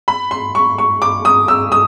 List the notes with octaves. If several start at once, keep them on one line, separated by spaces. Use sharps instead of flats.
B5
C6
C#6
C#6
D6
D#6
E6
D#6